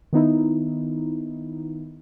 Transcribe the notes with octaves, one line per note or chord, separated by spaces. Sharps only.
D#3 B3 D#4 E4